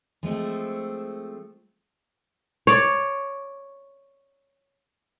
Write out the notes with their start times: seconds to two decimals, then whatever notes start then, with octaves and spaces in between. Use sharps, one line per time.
0.23 F3 G#3 A3 C4
2.67 C#5 D5